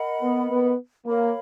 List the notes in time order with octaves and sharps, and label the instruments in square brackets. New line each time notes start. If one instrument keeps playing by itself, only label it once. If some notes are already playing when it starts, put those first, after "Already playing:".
Already playing: [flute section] A#4 D#5 F#5 B5
[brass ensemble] B3
B3
[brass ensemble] A#3 [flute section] A#4 C#5 F5 B5